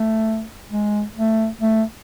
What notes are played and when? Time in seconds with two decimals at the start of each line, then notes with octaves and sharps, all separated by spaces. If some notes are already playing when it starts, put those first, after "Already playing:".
Already playing: A3
0.71 G#3
1.16 A3
1.61 A3